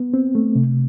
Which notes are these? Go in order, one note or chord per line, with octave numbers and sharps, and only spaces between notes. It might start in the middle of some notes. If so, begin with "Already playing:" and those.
Already playing: B3
C4
A3
C3